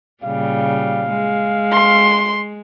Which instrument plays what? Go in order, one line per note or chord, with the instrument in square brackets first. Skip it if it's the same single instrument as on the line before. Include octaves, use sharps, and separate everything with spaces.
[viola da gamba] A#2 C#3 G3 [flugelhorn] F5
[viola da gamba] G#3
[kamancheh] C6